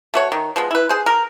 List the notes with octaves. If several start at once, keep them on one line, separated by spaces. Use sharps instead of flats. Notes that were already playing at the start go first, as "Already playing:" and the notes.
A3 F#4 C#5
D#3
F3 G#3 B3
E4 B4
G#4 C5
A#4